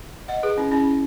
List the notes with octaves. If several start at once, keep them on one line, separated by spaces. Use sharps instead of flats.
D#5 F#5
G#4 B4
C#4 E4
C#4 E4